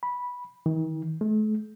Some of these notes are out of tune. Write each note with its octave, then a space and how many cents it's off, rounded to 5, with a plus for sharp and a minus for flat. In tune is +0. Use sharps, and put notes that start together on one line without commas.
B5 -10
D#3 +45
A3 -40